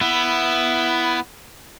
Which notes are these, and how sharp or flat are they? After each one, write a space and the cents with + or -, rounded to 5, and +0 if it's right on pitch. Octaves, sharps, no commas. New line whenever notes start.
B3 +0 E4 +10